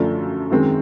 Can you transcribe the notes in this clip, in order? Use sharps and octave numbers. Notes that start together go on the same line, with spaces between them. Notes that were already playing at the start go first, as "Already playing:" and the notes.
Already playing: F#2 D3 F3 A3 D4
F#2 D#3 G#3 C4